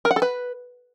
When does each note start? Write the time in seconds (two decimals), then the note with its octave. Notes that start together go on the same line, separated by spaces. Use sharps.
0.05 A#4
0.11 F#5
0.16 A4
0.22 B4